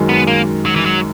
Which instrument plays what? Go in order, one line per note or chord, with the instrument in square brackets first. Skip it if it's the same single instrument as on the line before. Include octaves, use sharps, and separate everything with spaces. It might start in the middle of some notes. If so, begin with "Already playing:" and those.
Already playing: [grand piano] F#2 D#3 G#3
[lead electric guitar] B3
A#3
F#3
E3
F#3